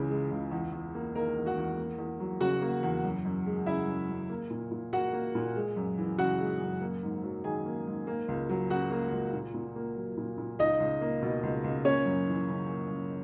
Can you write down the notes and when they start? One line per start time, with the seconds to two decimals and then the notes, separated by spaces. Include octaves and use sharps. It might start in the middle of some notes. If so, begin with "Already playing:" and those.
Already playing: C#2 C#3 E3 G#3
0.11 G#3
0.31 C#2
0.51 E2
0.72 E2
0.95 A#3
1.15 D#3 A#3 A#4
1.36 E2
1.46 F#4 F#5
1.58 E2
1.78 A#3
1.99 E2
2.20 F#3
2.41 C#3 F#4 F#5
2.62 A#3
2.83 E2
3.04 F#2
3.25 F#2
3.46 G#3
3.66 C#3 E4 E5
3.88 F#2
4.09 F#2
4.30 A#3
4.50 A#2
4.71 A#2
4.93 A#3 F#4 F#5
5.13 A#3
5.35 A#2
5.56 G#3
5.76 F#2
5.98 E3
6.18 C#3 F#4 F#5
6.40 G#3
6.60 F#2
6.81 A#3
7.03 G#2
7.23 F#3
7.44 D#3 G#4 G#5
7.65 A#3
7.87 G#2
8.07 A#3
8.28 C#2
8.49 F#3
8.70 C#3 F#4 F#5
8.91 A#3
9.12 C#2
9.33 A#2
9.54 A#2
9.76 A#3
9.96 F#3
10.17 A#2
10.38 A#2
10.59 C#2 D#4 D#5
10.80 C#2
11.01 A#3
11.22 B2
11.43 C#2
11.64 C#2
11.85 A#3 C#4 C#5
12.05 F#2
12.27 E3
12.48 C#3
12.69 A#3
12.90 F#2